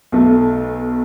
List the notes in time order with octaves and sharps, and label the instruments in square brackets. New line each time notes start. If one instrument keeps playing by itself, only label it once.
[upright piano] B1 A3